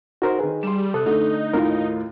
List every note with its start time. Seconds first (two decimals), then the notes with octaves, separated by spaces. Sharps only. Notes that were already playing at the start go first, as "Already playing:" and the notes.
0.22 D#4 F#4 A#4 C5
0.39 D#3 G#4 B4
0.63 G3 C6 E7
0.94 C3 A4 D#6 F#6
1.06 D3 A3 D#4
1.53 D#2 A2 F4 A#4